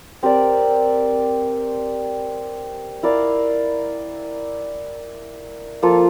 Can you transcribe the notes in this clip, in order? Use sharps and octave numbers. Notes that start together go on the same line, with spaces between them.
C4 G4 A#4 D5
E4 A#4 D5 F5
F3 A#3 F4 A4